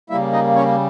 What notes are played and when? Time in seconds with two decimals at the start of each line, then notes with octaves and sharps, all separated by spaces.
0.10 C#3 G3 A#3 E4 E5
0.33 D#4 D#5
0.55 C#4 C#5